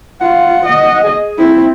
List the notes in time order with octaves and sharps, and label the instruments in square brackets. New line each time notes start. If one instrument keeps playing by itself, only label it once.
[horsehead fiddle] F4 [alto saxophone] F#5
[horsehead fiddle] D#5
[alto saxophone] G#4
[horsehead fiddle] C4 E4